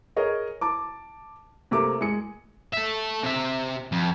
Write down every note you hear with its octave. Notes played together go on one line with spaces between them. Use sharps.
G#4 A#4 C#5 D#5
A5 D6
C3 A3 A#3 D6
G#3 C#7
A4 E5
C3 E5
F2